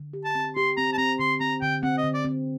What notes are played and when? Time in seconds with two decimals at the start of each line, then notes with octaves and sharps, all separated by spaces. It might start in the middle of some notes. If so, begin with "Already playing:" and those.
Already playing: D3
0.13 G4
0.25 A5
0.35 C4
0.56 G4 C6
0.77 C4 A#5
0.93 A5
0.98 C4 A#5
1.19 D3 C6
1.40 C4 A#5
1.61 D3 G5
1.83 C4 F#5
1.98 D#5
2.04 D3
2.14 D5
2.24 C4